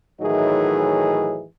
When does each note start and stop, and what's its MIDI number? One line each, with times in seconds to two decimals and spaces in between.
0.21 1.44 45
0.21 1.44 51
0.21 1.44 52
0.21 1.44 54
0.21 1.44 63
0.21 1.44 68